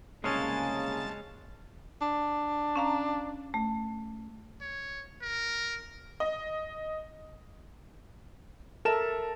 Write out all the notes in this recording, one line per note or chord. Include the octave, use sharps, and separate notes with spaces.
C2 C#3 G#3 A#3 C#4 G#5 A5 A6
D4
C#4 F5 A#5
A3
C#5
A#4
D#5
A4 A#4 E5 A5 E7